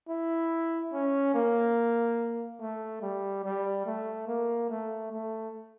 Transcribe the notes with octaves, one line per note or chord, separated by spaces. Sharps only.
E4
C#4
A#3
A3
G3
G3
A3
A#3
A3
A3